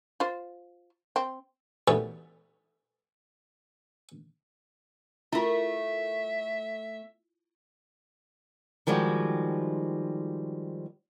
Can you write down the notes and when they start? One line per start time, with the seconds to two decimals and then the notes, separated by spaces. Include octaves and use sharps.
0.20 F4 C5
1.16 C4
1.88 D#3 E3 F#3 G3 A3 B3
5.33 A3 E4 F4 A#4 E5
8.87 D#3 F3 G3 G#3 F#4